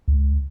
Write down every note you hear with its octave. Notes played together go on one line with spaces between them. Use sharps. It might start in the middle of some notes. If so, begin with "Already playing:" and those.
C#2